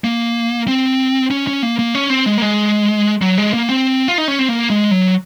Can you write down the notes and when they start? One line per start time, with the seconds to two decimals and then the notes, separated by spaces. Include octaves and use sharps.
0.04 A#3
0.68 C4
1.31 C#4
1.47 C#4
1.63 A#3
1.79 A#3
1.95 C#4
2.10 C4
2.26 G#3
2.38 A#3
2.42 G#3
3.22 F#3
3.38 G#3
3.54 A#3
3.69 C4
4.08 F4
4.18 D#4
4.28 C#4
4.39 C4
4.49 A#3
4.70 G#3
4.91 F#3